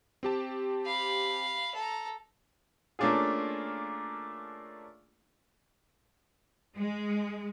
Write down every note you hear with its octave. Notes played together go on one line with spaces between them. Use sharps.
C4 G4 A5
F5 B5
A4 A#5
A3 A#3 C#4 D4 F4 G#4
G#3